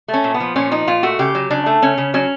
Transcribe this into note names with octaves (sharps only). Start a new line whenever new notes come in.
A3
C#4
A#2
B3
F3
A#2 C#4
F3 D#4
A#2 F4
A3 F#4
C#3 G4
F#3
C#3 D4
A3
C#3 C#4
C#3
F#3 C#4